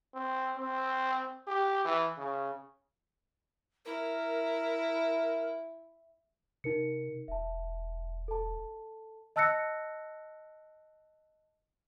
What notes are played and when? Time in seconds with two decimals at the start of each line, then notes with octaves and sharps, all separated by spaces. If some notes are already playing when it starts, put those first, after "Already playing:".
0.14 C4
0.56 C4
1.47 G4
1.85 E3
2.18 C#3
3.86 E4 A#4
6.64 C3 D#4 A#4 C#7
7.28 E1 E5 A5
8.28 A4 A5
9.36 D#5 A5 E6 F#6 A#6 C#7